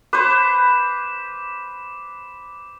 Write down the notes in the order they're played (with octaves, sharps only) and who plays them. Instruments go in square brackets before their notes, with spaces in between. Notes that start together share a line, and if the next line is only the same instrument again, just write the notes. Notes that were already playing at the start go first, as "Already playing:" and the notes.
[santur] B4 C5 [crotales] D6